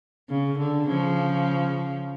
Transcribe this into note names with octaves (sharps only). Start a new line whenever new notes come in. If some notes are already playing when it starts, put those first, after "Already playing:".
C#3
D3
C#3 F3